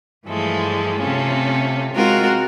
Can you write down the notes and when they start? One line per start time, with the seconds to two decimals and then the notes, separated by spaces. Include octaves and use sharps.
0.26 G2 E3 F3 G#3 A3
1.01 C3 A3 C4 C#4 F4
1.93 G#3 C4 F4 F#4 A#4 F#5